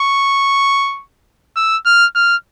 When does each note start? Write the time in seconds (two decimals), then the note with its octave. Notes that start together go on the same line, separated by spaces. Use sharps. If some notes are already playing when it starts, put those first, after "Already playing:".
Already playing: C#6
1.57 E6
1.86 F6
2.15 F6